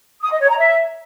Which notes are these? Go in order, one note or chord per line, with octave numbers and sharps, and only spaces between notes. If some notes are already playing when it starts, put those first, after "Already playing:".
D#6
D#5
C#5
A#5
E5